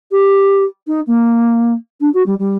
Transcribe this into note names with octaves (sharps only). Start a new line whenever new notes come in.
G4
D#4
A#3
D4
F#4
G3
G3